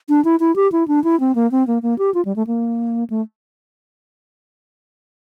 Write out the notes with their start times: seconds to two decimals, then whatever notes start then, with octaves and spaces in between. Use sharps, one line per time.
0.09 D4
0.25 E4
0.40 E4
0.56 G4
0.72 E4
0.88 D4
1.04 E4
1.20 C4
1.35 A#3
1.51 C4
1.67 A#3
1.83 A#3
1.98 G4
2.14 F4
2.25 G3
2.36 A3
2.47 A#3
3.10 A3